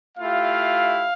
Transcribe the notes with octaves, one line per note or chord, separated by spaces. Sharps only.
A3 E4 F4 G4 F5